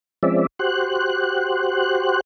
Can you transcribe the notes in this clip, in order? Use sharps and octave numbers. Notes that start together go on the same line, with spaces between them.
F3 G#3 C4 C#4 D5 E5
F#4 G4 C5 F#6